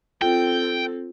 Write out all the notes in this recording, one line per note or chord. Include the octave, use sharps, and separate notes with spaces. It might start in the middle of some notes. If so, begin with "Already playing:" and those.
C4 F4 A4 G5